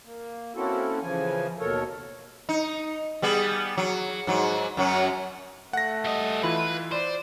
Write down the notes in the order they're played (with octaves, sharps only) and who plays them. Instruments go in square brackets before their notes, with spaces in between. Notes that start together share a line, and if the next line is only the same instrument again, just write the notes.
[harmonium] A#3
A#3 C4 C#4 E4 F#4 A4
C#3 E3 F3 G#5
D#2 B2 A4 A#4 C#5
[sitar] D#4
G3 B3 G#4
F#3
G#2 F#3
F#2 F#3 C#4
[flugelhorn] A3 [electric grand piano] F#5 A#6
[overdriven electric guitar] G3 D#5
[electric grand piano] E3 E4 F4 [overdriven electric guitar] B4
[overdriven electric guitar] C5 [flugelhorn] D5